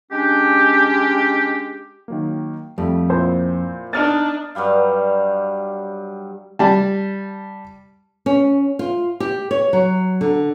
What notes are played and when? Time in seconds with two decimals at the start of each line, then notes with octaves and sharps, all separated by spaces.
0.12 G#3 C#4 D4 G4
2.08 D#3 F#3 A#3
2.78 F2 G3 A3
3.10 A#2 E4 C5
3.93 B3 D4 D#4 F6 A6
4.55 G2 F#3 G3 F5
6.59 G3 A5
8.26 C#4
8.79 F4
9.20 G4
9.51 C#5
9.73 F#3
10.21 D3